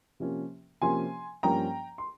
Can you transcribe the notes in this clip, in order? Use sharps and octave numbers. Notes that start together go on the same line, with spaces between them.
C3 F3 A#3 C#4
C3 F3 A#3 C#4 G#5 C6
G2 F3 A#3 C#4 G5 A#5
C6